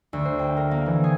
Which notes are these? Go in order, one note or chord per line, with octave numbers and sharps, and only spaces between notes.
D2
C5
G5
A#4
A#3
E3
G#4